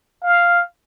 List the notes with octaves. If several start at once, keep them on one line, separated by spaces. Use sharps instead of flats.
F5